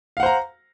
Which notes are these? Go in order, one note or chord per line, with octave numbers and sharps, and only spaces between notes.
C5 F5 F#5 A#5